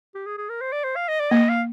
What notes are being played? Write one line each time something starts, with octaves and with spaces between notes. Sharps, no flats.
G4
G#4
G#4
A#4
C5
D5
C5
F5
D#5
D5
A#3 D#5
F5